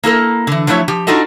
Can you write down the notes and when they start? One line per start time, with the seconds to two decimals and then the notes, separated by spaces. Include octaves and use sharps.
0.03 A#3 E4 A4 A#4
0.47 D3 E3
0.67 F3 F#3 A3 E4 C#5
0.88 F3 G4
1.07 D4 D#4 F4 F#4 A4 D#5